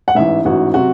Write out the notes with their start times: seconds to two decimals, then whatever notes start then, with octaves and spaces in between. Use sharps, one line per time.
0.08 F#5
0.15 A1 G#2 E3 E5
0.45 A1 G#2 E3 F#4
0.74 C3 F#3 F#4